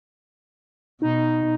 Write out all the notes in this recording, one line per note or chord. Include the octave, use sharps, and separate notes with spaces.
B2 D#4